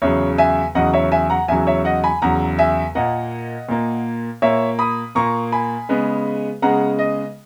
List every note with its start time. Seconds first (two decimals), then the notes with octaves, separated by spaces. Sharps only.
0.02 E2 C#3 F#3 C#5 E5
0.38 E5 G#5
0.75 E2 C#3 F#3 D#5 F#5
0.93 C#5 E5
1.12 E5 G#5
1.30 F#5 A#5
1.48 E2 C#3 F#3 E5 G#5
1.67 C#5 E5
1.85 D#5 F#5
2.04 G#5 B5
2.22 E2 C#3 F#3 F#5 A#5
2.59 E5 G#5
2.95 A#2 A#3 D#5 F#5
3.69 A#2 A#3
4.42 A#2 A#3 C#5 E5
4.79 B5 D#6
5.15 A#2 A#3 A#5 C#6
5.52 G#5 B5
5.89 C#3 G#3 B3
6.62 C#3 G#3 B3 F#5 A#5
6.99 D#5